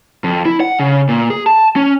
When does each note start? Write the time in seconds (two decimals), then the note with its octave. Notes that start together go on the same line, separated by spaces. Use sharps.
0.24 F2
0.45 E4
0.60 F#5
0.79 C#3
1.09 A#2
1.30 G#4
1.47 A5
1.76 C#4